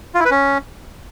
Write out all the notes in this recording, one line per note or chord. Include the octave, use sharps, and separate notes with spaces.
F4
E4
B4
C#4